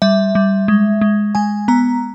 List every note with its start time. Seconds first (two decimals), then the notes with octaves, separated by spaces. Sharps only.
0.02 G3 E5
0.35 G3
0.68 G#3
1.01 G#3
1.35 G#3 G#5
1.68 B3 A#5